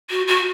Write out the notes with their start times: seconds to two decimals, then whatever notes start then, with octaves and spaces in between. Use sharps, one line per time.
0.10 F#4
0.27 F#4